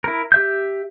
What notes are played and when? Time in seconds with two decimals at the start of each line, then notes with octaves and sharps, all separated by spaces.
0.04 E4 A#4
0.32 G4 E5 G6